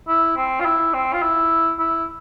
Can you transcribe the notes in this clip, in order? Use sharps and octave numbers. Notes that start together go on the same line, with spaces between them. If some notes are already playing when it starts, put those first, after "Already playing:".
E4
C4
F4
E4
C4
F4
E4
E4